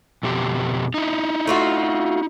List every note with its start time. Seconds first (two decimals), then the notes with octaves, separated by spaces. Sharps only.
0.23 F2 B2 G4
0.94 D#4 E4
1.47 A3 F4 F#4